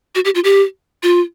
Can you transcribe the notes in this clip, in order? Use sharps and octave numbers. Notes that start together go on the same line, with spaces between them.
F#4
G4
F4
G4
F4